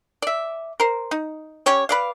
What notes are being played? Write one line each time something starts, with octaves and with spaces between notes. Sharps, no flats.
D5 E5
A#4 C5
D#4
C#4 G4 C#5 D5
B4 D5 F5